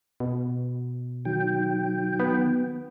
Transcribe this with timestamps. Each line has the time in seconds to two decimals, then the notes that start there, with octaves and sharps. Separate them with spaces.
0.20 B2
1.25 D#3 F#3 G5
2.20 B3